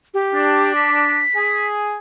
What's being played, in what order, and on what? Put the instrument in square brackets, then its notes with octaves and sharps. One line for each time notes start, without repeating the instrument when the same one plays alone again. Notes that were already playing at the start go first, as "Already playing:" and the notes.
[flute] G4
[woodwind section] D4
[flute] B6
[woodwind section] G#4 G#5